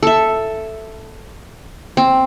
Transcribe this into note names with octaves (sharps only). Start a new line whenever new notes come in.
A4 E5
C4